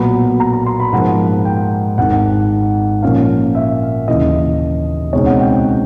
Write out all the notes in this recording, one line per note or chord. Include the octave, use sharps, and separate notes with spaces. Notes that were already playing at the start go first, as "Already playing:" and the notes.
Already playing: B1 A#2 F#3 B3 B5
A#5
A#5
C6
B5
G#2 F3 A#3 F#5
G5
G#1 G#2 D#3 F#5
A#2 F3 A#3 C#4 F4 F5
E5
D#2 C#3 E3 D#5
C#2 B2 G#3 C4 D#4 C#5
F#5
G5
G5